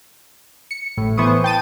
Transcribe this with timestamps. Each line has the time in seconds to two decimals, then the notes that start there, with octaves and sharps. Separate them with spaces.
0.71 C#7
0.97 A1 A2
1.17 A2 E3 B3 C5 C#6 D#6
1.44 G5 A5 D#7